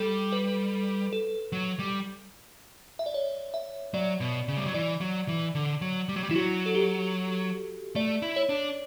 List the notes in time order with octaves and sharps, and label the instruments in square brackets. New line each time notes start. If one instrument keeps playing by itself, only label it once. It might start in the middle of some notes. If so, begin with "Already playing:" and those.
Already playing: [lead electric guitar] G3 [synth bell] A4
[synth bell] B4
A4
[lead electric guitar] F#3
G3
[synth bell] E5
D5
C#5
E5
[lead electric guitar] F#3 [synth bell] D5
[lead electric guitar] B2
C#3
G3
F#3
[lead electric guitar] E3 [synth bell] D5
[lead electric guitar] F#3
E3
D3
F#3
G3
F#3
G3
[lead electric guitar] E3 [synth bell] E4
[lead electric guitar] F#3 [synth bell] F#4
[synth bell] A4
G4
[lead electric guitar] A3 [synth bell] D5
[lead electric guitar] E4
[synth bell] C#5
[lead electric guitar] D4